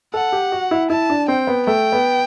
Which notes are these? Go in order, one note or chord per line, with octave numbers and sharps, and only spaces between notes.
A4 F#5
G4
F#4
E4
E4 A5
D4
C4 G5
B3
A3 G5
B3